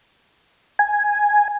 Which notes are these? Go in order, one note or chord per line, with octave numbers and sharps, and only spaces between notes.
G#5